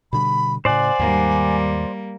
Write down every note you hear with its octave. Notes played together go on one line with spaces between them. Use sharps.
B2 D3 G3 B5
A2 C#3 C5 D5 F#5 G#5
D#2 G#2 D#3 G3 A#3